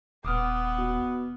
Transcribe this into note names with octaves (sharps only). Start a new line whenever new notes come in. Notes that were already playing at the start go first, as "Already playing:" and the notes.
D#1 B3 D6 D#6 F6
B2